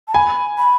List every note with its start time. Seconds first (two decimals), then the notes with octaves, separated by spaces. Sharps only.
0.08 A5
0.14 G#5 B5
0.58 B5